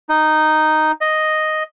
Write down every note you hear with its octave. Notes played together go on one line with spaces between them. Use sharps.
D#4
D#5